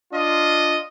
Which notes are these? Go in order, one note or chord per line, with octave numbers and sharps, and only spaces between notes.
D4 F4 D#5